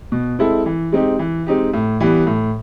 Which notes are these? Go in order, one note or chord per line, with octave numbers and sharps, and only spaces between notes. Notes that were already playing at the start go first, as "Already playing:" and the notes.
B2
G#3 C4 E4 A4
E3
G#3 C4 D#4 G4
E3
G#3 C4 D#4 G4
A2
E3 G3 B3
A2